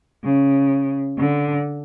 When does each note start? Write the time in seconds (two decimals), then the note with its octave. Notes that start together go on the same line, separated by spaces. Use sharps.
0.24 C#3
1.19 D3